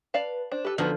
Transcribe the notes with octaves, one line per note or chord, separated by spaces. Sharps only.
B4 D5 F5 A5
D4 C5
G4 A4 B4
D3 F3 B3 D#4 F#4 F6